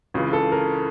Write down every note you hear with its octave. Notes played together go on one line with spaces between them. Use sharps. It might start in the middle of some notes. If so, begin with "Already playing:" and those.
C#2 C#3 E3
A4
A#4